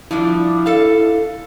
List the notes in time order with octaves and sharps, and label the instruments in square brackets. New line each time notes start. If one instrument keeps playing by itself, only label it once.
[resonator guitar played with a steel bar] F3 G3 D4 [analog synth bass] E4
[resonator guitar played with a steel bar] A4 F5